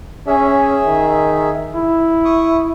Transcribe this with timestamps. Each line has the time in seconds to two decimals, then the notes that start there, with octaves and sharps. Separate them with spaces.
0.27 C#4 G#4 E5
0.86 D#3
1.75 E4
2.25 C#6 D#6